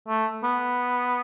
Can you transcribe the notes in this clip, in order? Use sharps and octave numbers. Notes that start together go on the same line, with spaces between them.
A3
B3